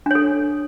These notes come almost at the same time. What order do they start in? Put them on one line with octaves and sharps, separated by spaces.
D4 C#5 A4